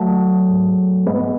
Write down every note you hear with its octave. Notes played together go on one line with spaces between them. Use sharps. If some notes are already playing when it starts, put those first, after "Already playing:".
Already playing: F#3 A3
G#2
G#2 G#3 B3